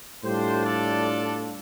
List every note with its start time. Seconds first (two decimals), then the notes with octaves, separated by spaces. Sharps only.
0.24 A2 G3 D4 F4 G4 C5
0.65 A4 D5